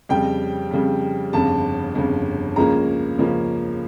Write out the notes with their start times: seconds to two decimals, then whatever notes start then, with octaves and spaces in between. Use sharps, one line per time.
0.09 F2 C#3 G3 G5
0.71 F2 C#3 G3
1.33 G1 F2 C#3 A5
1.95 G1 F2 C#3
2.56 C#2 C#3 F3 A#3 C#4 A#5
3.19 C#2 C#3 F3 A#3 C#4